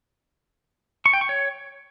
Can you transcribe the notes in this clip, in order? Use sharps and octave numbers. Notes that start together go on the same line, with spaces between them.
C#6
G5
C#6
C#5